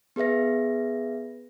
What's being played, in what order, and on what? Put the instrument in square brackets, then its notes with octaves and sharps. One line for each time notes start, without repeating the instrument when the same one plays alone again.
[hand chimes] B3 G#4 B4 E5 A#6